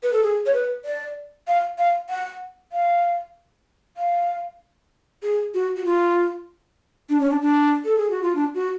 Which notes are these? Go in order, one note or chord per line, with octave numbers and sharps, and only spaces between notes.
B4
A4
G#4
C#5
B4
D5
F5
F5
F#5
F5
F5
G#4
F#4
F#4
F4
D4
C#4
D4
D4
A4
G#4
F#4
F4
D4
F#4